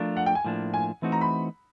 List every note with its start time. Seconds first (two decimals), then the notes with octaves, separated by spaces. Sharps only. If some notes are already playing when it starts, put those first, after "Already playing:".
Already playing: F3 A3 D4 F4 A#4
0.17 F#5
0.26 G5
0.35 G#5
0.45 A2 F3 A#3 D4
0.74 G#5
1.02 E3 A3 C4 D#4 F#4
1.12 A#5
1.21 B5